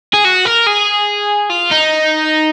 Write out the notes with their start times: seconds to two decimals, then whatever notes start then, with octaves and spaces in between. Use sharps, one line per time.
0.14 G#4
0.25 F#4
0.46 A#4
0.67 G#4
1.50 F4
1.71 D#4